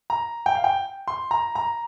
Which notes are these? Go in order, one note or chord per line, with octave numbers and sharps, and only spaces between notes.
A#5
G5
F5
G5
C6
A#5
A#5